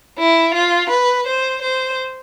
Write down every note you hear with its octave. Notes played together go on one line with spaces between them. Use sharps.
E4
F4
B4
C5
C5